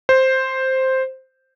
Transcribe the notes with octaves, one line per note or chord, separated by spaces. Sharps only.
C5